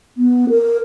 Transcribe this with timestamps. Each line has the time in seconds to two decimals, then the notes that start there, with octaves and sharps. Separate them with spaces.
0.17 B3
0.50 A#4